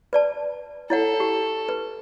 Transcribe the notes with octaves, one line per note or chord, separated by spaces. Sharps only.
B4 D5 A5
E4 A4 C#5 F#5
G4
B4